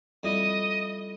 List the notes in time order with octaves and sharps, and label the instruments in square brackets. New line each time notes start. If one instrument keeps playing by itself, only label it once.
[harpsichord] F2 G3 E4 [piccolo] D#5